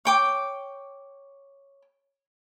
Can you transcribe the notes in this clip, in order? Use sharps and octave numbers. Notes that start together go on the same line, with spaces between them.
C#5 G5 D6